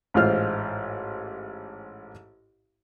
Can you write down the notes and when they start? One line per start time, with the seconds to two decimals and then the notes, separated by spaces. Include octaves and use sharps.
0.14 A1 G#2 F4 C5 F6